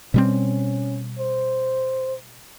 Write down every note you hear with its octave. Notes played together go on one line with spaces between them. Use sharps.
B2 G3 C4 C#4
C5